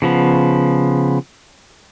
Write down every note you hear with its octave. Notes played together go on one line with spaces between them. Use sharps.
C#3 F3 B3